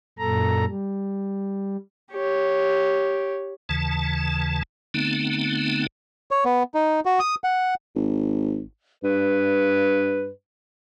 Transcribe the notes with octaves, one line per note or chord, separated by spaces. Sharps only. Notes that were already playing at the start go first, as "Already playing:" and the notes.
F#2 A#2 A4 A#5
G3
G4 C#5
D#2 C#3 E3 A5
D3 A3 B3 C4 D#4
C#5
B3
D#4
F#4
D#6
F#5
G#1
G2 B4